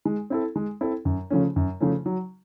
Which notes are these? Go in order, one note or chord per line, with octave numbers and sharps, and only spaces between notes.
G#3
C4 E4 A4
G#3
C4 E4 A4
F#2
C#3 F3 A3 C#4
F#2
C#3 F3 A3 C#4
F#3